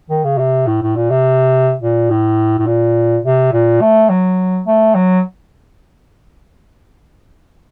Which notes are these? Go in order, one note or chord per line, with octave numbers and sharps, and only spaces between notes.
D#3
C#3
C3
A2
A2
A#2
C3
A#2
A2
A2
A#2
C3
A#2
A3
F#3
A3
F#3